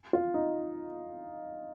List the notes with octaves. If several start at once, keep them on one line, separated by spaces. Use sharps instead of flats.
F4
D#4